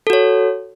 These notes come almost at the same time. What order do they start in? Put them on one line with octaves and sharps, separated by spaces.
A4 F#4 C#5